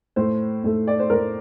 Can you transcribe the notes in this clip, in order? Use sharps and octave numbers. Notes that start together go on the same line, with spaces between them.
A2 A3 C5
A2 A3
D5
C5
A2 A3 A#4